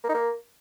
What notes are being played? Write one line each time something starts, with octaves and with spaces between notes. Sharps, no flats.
A#3
D#4
A#3